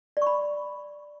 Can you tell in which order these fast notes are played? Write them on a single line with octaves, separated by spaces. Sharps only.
D5 C#6 B5